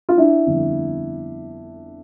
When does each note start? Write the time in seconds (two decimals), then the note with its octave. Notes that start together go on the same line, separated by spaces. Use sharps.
0.09 F4
0.18 D4 E4
0.47 G1 F2 D3